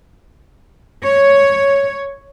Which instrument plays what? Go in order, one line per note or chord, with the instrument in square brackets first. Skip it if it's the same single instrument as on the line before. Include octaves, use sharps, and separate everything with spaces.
[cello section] C#5